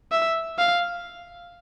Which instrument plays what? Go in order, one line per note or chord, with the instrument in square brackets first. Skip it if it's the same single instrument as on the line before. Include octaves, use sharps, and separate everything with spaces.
[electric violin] E5
F5